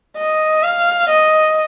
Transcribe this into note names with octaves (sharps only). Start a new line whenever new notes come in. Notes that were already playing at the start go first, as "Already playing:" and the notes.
D#5
F5
D#5